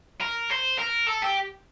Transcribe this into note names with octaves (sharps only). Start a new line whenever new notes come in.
A#4
C5
A#4
A4
G4